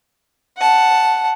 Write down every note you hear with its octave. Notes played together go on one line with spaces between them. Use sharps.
F#5 A5